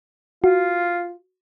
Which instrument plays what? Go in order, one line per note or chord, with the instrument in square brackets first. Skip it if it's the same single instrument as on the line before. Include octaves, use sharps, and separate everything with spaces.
[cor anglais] F4 [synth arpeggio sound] F#4